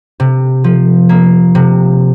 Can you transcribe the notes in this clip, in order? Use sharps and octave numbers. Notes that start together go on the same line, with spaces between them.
C3
F3
A#3
C3